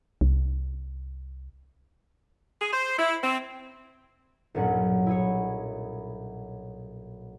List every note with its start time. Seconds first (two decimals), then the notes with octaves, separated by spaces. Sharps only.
0.21 C2
2.61 G#4
2.73 C5
2.98 E4
3.22 C4
4.55 B1 G2 A#2 F#3 C#4 F#5
5.06 E4 G#4 C#5